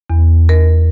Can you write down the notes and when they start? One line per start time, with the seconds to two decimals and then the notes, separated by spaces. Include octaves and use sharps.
0.10 E2
0.49 A#4